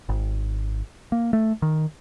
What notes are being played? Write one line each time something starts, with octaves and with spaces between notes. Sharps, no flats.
G#1
A#3
A3
D#3